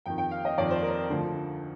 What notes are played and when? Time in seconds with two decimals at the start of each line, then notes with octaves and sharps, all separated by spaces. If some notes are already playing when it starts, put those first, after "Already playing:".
0.06 F2 D#3 G5
0.18 G5
0.31 F5
0.45 D#5
0.58 F2 D#3 D5
0.70 C5
0.83 A#4
1.10 D2 D3 F3